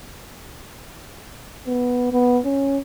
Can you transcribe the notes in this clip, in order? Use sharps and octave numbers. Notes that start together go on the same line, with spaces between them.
B3
B3
C#4